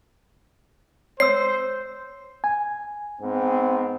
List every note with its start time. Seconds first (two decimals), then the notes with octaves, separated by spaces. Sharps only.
1.20 C5 C#5 E6 C7
2.44 G#5
3.22 G#2 B3 C4